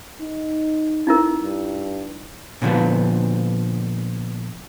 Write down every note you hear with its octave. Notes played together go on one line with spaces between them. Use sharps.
D#4
D#4 E4 A#4
G2
A#2 D3 E3 F3 B3